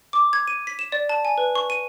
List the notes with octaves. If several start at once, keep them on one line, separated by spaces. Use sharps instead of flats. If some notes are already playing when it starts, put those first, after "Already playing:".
D6
G#6
D#7
B6
E7
D5
A5
G#5
B4
C#6
D#7